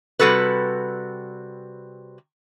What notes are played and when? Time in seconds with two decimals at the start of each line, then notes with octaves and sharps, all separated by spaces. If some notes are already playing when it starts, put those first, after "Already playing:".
0.19 C3 G3 F#4 A4 B4